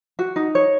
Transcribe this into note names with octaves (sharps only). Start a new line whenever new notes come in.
F#4
D#4
C#5